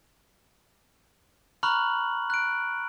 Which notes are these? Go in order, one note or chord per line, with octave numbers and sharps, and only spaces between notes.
A#5 B5 C#6 F6 F#6 F#7
F#6 D7